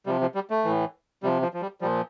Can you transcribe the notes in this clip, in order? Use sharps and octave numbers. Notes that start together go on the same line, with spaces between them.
C3 F3 G3
F3
G3
A3
A2 E3
C3 F3 G3
F3
F3
G3
A#2 F3 G3